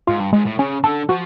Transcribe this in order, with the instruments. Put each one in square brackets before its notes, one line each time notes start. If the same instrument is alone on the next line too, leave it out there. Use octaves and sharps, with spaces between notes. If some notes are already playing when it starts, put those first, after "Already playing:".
[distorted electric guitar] G#2 [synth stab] F4
[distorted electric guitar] G2
[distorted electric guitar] G#2 [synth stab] G#3
[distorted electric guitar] A2
[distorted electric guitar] C#3 [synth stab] C#4
[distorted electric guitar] D3 [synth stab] A4
[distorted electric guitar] F3 [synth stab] F#4